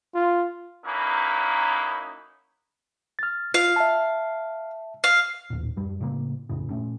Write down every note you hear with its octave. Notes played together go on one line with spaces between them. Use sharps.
F4
F#2 A#3 C#4 D#4 E4 B4
F6 A6
F4 F5
E5 A5
F5
A1 D#2 A#2
F#2 G3
A2 C#3 G3 A#3
A1 F2 A2 C#3
A#2 A3 C#4